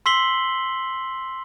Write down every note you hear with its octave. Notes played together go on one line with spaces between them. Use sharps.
C6 E6 B6 C7 F#7 G7